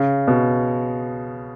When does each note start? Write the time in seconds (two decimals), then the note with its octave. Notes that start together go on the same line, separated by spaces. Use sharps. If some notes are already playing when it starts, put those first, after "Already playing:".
Already playing: C#3
0.28 B2